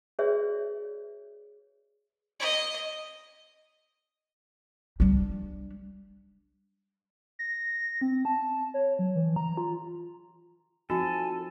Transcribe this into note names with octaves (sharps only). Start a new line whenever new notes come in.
F#4 G#4 B4 C#5 D5 E5
D#5
G3 D4
A#6
C4
A5
C#5
F#3
E3
A#5
F4
F3 C4 D#4 F#4 A4 G#5